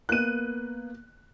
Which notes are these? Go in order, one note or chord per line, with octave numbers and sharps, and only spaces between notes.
A#3 B3 F#6 D#7